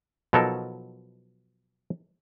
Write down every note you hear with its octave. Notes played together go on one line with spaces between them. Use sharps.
B2 F3 F#3 D#4 A4 A#4